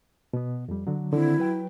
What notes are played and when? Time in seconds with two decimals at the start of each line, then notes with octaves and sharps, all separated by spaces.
0.33 B2 B3
0.68 F2 G3
0.87 D3 F#3
1.13 D3 D#3 C4 E4
1.39 F#3 B4 G5